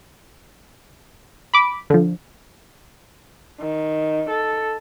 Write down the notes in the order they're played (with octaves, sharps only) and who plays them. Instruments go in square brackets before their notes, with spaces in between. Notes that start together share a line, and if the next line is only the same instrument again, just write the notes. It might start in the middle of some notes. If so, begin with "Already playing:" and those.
[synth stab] B5 D6
D3 F3
[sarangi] D#3
A4